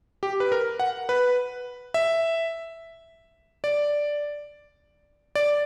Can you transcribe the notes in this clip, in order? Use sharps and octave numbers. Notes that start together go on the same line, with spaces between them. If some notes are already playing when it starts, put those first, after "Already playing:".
G4
B4
A#4
F#5
B4
E5
D5
D5